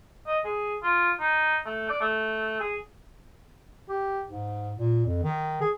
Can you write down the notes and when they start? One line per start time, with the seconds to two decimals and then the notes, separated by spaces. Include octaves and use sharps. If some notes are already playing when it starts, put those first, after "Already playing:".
0.27 D#5
0.45 G#4
0.83 F4
1.20 D#4
1.66 A3
1.90 D5
2.01 A3
2.60 G#4
3.88 G4
4.25 G#2
4.79 A#2
5.06 F2
5.23 D#3
5.61 G#4